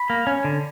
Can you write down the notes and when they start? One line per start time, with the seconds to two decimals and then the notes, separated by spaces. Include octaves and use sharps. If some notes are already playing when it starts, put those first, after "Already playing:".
Already playing: B5
0.10 A#3
0.27 C#4
0.44 D3